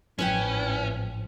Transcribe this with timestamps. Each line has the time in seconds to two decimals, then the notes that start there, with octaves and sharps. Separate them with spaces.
0.19 A1 G#2 F3 C#4 E4 B4 G5